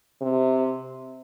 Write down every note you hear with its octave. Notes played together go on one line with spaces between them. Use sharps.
C3